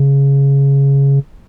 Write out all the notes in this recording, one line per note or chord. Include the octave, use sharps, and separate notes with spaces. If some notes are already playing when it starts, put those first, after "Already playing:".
Already playing: C#3